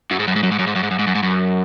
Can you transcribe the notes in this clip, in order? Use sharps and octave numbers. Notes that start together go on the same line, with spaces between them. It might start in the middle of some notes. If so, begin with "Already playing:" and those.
F#2
G#2
F#2
G#2
F#2
G#2
F#2
G#2
F#2
G#2
F#2
G#2
F#2
G#2
F#2